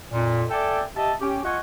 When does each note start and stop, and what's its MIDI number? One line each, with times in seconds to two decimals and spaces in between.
0.12 0.44 41
0.12 0.44 46
0.50 0.81 69
0.50 0.81 74
0.50 0.81 76
0.50 0.81 79
0.50 0.81 80
0.96 1.12 67
0.96 1.12 75
0.96 1.12 76
0.96 1.12 81
1.21 1.40 61
1.21 1.40 67
1.44 1.59 65
1.44 1.59 75
1.44 1.59 78
1.44 1.59 80
1.44 1.59 85